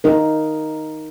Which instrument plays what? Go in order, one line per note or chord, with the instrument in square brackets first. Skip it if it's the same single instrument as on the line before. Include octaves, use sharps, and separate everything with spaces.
[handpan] D#4 A#4